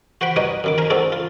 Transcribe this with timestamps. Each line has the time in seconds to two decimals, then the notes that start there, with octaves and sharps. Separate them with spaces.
0.21 F#4 C5 F#5 G5 B5
0.36 G3 D#4 F#4 B4 C#5 D#5
0.64 F#2 D#3 D6
0.78 A#4 C5 G#5 A#5
0.90 G#2 A3 C4 D4 F#4 A4
1.12 F4